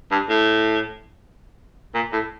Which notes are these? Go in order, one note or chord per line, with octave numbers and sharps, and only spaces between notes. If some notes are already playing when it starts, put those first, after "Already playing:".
G2
A2
A#2
A2